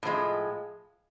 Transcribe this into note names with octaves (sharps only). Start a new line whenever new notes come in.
A2 F3 G#3